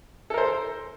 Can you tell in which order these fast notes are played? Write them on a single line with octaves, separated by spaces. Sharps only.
A4 A#4 C5